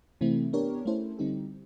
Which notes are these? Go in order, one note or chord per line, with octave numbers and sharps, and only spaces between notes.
C3 E3 A3 C4 E4
B3 D4 G4 A#4 C#5
A3 C#4 E4 A4 C5
D3 G3 C4 D#4 G4